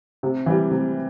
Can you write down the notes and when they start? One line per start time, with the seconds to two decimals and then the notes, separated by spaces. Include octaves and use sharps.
0.23 C3
0.46 E3 G3
0.71 C3